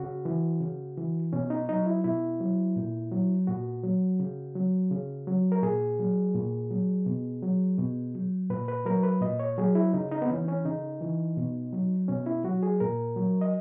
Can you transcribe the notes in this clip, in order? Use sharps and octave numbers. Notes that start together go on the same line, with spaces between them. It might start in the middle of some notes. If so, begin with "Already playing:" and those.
Already playing: C#3 F#4
E3
C#3
E3
B2 C#4
D#4
F#3 D#4
E4
B2 E4
F#3
A#2
F#3
A#2 F#4
F#3
C#3
F#3
C#3
F#3
A#4
A#2 G#4
F#3
A#2
F#3
B2
F#3
B2
F#3
A#2 B4
B4
F#3 A#4
B4
A#2 D#5
C#5
F#3 G#4
E4
C#3 D#4
D#4
B3
E3 C#4
C#4
C#3 D#4
E3
B2
F#3
B2 C#4
E4
F#3 F#4
G#4
A#2 A#4
F#3
D#5